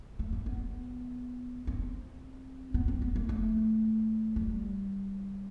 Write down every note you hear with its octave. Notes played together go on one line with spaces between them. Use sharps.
A3
A#3
B3
C4
B3
C4
B3
A#3
A3
G3